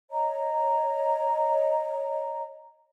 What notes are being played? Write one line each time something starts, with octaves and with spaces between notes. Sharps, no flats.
C#5 D#5 A#5